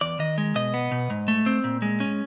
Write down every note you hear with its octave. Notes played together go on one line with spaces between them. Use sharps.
E2 D5
D#3 D#5
G#3
B2 D#5
B3
B2
G#2
A3
C4
A#2
G#3
C#4